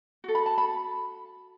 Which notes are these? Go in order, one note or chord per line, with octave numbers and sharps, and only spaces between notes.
F#4 A4
B5
A5
B5